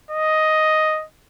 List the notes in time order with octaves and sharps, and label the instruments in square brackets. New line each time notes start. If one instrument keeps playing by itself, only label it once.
[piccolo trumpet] D#5